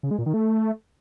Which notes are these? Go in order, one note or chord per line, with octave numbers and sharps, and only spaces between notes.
C#3
G#3
A#2
D#3
A3